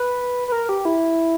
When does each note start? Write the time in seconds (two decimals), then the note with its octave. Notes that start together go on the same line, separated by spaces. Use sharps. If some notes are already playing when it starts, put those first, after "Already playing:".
Already playing: B4
0.48 B4
0.52 A#4
0.69 G4
0.85 E4